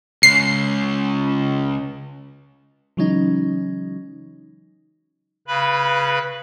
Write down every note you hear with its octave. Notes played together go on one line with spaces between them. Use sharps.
C#2 C7
C#3 E3 F#3 G#3 C#4 D#4
C#3 B4 B5